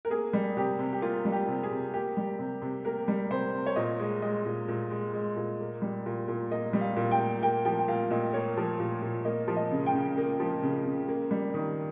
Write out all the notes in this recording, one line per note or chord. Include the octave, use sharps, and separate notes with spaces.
A#4
A#3 G#4
G3
C3 G4
C3
G4
A#3 F4
G3
G4
C3
G#4
C3
A#3 G4
G3
C3
C3
A#3 A#4
G3
C3 C5
C3
C#5
A#2 D#5
G#3
G#3 D#5
A#2
A#2
G#3
G#3
A#2
A#3
G3
A#2
A#2
A#3 D#5
G3
F5
A#2
G5
A#2
A#3 G5
F3 G5
G5
A#2 F5
A#2 D#5
A#3 C#5
F3
A#2
A#2
A#3 D#5
F3
D#5
C#3
G5
C#3
A#3
F3
C#3
C#3
A#3
G3
D#3